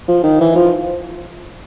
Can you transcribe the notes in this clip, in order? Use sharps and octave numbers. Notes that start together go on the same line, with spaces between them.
F3
D#3
E3
F3